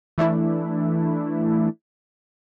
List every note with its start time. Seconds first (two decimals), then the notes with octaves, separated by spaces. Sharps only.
0.18 E3 A3 D4 E4